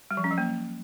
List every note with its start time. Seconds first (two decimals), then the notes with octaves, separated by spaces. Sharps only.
0.11 G3
0.17 F3
0.24 C#4
0.31 F#3
0.38 A#3